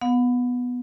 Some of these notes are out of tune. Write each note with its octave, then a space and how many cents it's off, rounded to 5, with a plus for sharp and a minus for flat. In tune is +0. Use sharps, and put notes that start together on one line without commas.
B3 +0 F#5 -40